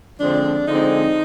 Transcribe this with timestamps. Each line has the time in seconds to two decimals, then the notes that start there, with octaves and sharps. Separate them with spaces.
0.20 D3 F3 G#3 C4 D4
0.68 D3 F3 G#3 C4 D#4